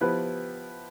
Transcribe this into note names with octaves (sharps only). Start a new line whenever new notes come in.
F3 B3 E4 G4 B4